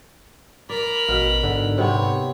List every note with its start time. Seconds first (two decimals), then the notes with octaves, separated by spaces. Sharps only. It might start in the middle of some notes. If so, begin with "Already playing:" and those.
0.70 A#4 D5 B5
1.08 A1 B2 F5
1.43 G#2 D3
1.78 C3 B3 C4 C#5